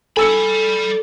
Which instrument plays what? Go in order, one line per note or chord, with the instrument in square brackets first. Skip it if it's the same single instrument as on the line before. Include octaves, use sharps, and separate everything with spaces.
[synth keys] A4 [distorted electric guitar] D5 B5 [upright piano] G#5 E6 C#7